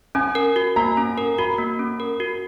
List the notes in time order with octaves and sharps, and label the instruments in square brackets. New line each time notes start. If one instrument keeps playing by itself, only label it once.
[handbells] C#4 [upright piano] G#5
[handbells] A#4
F#4
[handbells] A#3 [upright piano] A#5
[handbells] C#4
A#4
[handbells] F#4 [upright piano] B5
[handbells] A#3
C#4
A#4
F#4